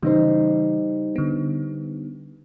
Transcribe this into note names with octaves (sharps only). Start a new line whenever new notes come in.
C#3 E3 G3 D#4 C5
D3 B3